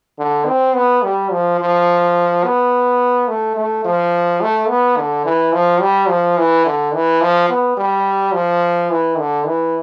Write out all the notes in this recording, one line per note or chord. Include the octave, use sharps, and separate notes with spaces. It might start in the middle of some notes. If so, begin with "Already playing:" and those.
D3
C4
B3
G3
F3
F3
B3
A3
A3
F3
A3
B3
D3
E3
F3
G3
F3
E3
D3
E3
F3
B3
G3
F3
E3
D3
E3